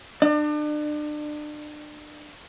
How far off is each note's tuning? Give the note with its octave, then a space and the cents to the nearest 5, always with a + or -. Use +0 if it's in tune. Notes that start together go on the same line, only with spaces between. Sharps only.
D4 +35 D5 +40